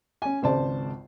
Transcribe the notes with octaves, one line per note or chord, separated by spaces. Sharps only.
C#4 G#5
G#1 C#2 C5 D5 A5